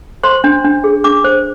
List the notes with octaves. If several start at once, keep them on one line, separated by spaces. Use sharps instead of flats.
C5 C6
D4
D4
G#4
D4 D6
C5